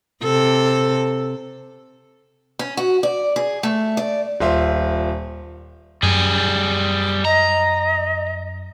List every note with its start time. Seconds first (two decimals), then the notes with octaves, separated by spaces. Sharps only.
0.24 C3 A4
2.59 C#4
2.77 F#4
3.03 D5
3.36 G#4
3.63 A3
3.97 D5
4.40 D#1 F4 C5 E5
6.03 F#2 G3 G#4
7.25 D#5 A#5